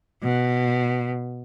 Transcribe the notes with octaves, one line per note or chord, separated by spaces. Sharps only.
B2